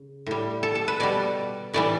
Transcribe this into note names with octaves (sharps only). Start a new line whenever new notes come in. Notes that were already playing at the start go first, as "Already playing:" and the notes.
Already playing: C#3
A2 G3
A4
A4
B4
B2 G3 D5
A2 E3 G3 D5